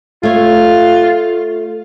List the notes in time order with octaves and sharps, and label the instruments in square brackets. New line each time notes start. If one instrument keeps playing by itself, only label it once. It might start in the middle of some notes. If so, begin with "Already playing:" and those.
[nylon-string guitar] A3 C#5 [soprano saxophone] F4